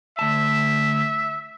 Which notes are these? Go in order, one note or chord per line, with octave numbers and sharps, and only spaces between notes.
D2 E5 A5